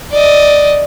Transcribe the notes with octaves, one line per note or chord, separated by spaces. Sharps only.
D5 D#5